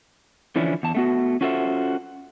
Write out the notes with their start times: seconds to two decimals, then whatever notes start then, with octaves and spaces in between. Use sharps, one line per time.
0.56 D3 E3 F3 C#4 D4 E4
0.83 E2 A5
0.95 A3 B3 F#4
1.41 C#4 F4 F#4 A4 C5 E5